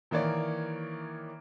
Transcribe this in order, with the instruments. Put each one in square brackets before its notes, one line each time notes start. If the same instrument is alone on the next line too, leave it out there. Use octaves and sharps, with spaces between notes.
[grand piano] D#3 E3 A#3 C#5 D5